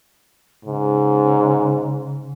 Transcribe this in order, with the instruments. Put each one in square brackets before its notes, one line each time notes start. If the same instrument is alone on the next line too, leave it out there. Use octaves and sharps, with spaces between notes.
[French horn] G#2 [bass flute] C#3